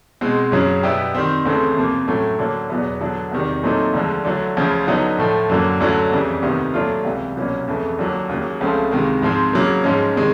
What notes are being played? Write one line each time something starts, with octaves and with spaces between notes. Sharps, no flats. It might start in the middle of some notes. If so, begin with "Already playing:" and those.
B2 G#3 C4
F#2 C#3 F#3
B2 G3 B3 E4 G4
D#3 G3 C4
D2 C#3 E3 A3 C4
F2 C3 F3 A#3
A2 F#3 A3 C#4
D3 F#3 A#3
E2 B2 F#3 B3
D3 F#3 B3 D4
E2 C3 D#3 G3
A#2 F#3 A3 C4 D#4
D2 D3 F3 G#3
D3 F#3 A3
D2 C#3 F3
D3 F#3 B3 D#4 F#4
A2 F3 A3
F#2 D3 F#3 A#3
D2 D3 F#3 A3 C#4
F2 C#3 E3 G3
D2 C3 D#3 G3 B3
A#2 F#3 A3 D4 F4
C#2 C3 E3 G3
C2 B2 F#3 A#3 C#4
F2 C#3 E3 A3
D#2 D3 F#3 A#3
D#2 C#3 F#3 A#3
C#2 C#3 F3 A3 C4
C#2 C3 D#3 G#3
G#2 F3 G#3 C4
C#3 F#3 A#3
G#2 F3 G#3 C#4
C3 D#3 G#3